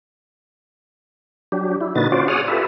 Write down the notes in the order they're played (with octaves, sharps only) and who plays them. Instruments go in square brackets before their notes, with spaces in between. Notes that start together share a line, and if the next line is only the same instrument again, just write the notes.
[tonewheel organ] F#3 D4 G4
E4
A#2 D3 D#4 F#4 B4 A6
C#4 F4 F#4 C5 D5
G#4 C#5 D5 F#5 D#6 F6
F4 G4 A4 B4 E5